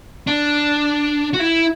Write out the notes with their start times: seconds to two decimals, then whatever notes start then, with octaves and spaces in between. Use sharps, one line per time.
0.27 D4
1.34 F#4
1.40 E4